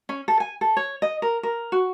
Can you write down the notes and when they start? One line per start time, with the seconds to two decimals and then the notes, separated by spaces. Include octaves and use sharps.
0.09 C#4
0.28 A4
0.40 G#5
0.61 A4
0.77 C#5
1.02 D#5
1.22 A#4
1.43 A#4
1.72 F#4